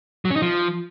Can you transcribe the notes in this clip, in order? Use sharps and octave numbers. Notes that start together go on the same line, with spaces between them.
F#3
C#4
D#4
F3